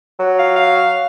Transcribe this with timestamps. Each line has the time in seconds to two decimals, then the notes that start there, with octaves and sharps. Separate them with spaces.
0.19 F#3
0.39 F5
0.56 F5